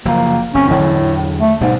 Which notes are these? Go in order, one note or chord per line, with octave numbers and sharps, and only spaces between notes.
F#1 F3 A#3
F#1 C4 C#4
E2 A2 D3 F#3
A3
D2 G#2 B2 G3